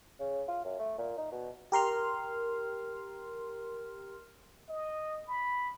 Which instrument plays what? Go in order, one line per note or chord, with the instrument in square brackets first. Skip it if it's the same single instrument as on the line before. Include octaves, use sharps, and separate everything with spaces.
[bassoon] C#3
F4
F#2
A3
A#2
D#4
B2
[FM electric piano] G4 A#4 C6 F6
[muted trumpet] D#5
B5